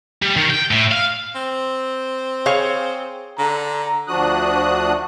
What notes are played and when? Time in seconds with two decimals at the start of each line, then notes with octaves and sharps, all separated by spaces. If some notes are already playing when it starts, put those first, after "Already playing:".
0.22 G3
0.36 D#3
0.50 G5
0.71 A2
0.91 F5
1.35 C4
2.46 G#4 C#5 F5
3.38 D3 A#5
4.08 D2 F3 D4 F#4 D#6 F#6